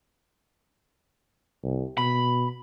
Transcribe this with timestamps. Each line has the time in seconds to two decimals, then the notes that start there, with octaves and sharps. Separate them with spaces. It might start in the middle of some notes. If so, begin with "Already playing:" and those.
1.64 C2
1.98 B2 B5